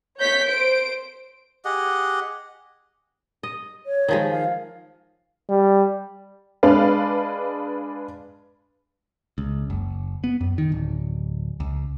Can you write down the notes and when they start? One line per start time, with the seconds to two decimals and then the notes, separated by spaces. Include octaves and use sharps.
0.19 C#5 G6 B6
0.47 C5 D7
1.65 G4 G#4 D#5 F#5
3.43 D#5
3.86 C#5
4.08 D#3 F3 G#3
4.31 F5
5.49 G3
6.63 G#3 D4 B4 F5
9.38 C#2
9.70 F#1
10.24 B3
10.41 F#2
10.58 D#3
10.72 D1
11.60 C#2